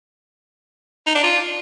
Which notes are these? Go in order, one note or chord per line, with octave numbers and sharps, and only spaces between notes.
D#4
D4
F4